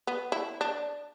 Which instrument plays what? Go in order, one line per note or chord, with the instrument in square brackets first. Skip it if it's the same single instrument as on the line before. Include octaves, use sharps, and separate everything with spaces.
[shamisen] B3
E4
D4